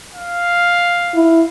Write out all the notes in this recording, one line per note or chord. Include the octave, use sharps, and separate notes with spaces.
F5
E4